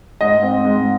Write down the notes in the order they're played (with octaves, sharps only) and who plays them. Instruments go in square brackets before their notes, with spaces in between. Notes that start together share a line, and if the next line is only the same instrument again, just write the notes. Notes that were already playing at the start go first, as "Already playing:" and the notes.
[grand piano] G#2 D#5
C4
G#2